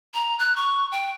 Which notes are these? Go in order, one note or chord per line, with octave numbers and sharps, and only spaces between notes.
A#5
F#6
C#6
G5